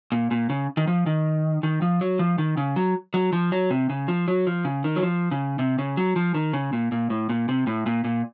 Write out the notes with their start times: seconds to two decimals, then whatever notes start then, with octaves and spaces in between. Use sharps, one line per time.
0.12 A#2
0.31 A#2
0.50 C#3
0.77 D#3
0.87 F3
1.06 D#3
1.63 D#3
1.82 F3
2.01 F#3
2.19 F3
2.38 D#3
2.57 C#3
2.76 F#3
3.14 F#3
3.33 F3
3.52 F#3
3.70 C3
3.90 C#3
4.08 F3
4.28 F#3
4.47 F3
4.65 C#3
4.84 D#3
4.96 F#3
5.03 F3
5.31 C#3
5.59 C3
5.79 C#3
5.97 F#3
6.16 F3
6.35 D#3
6.53 C#3
6.73 A#2
6.92 A#2
7.10 A2
7.29 A#2
7.49 C3
7.67 A2
7.86 A#2
8.04 A#2